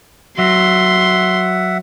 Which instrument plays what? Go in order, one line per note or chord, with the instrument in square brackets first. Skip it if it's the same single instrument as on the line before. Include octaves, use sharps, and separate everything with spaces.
[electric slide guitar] F#3 [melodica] E5 F#5 [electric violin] C6